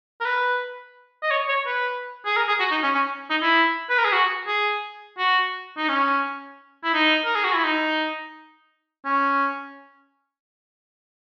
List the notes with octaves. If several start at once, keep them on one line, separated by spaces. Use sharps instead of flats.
A#4
B4
D#5
C#5
C#5
B4
G#4
A#4
G#4
F#4
D#4
C#4
C#4
D#4
E4
B4
A#4
G#4
F#4
G#4
F#4
D#4
C#4
E4
D#4
A#4
G#4
F#4
E4
D#4
C#4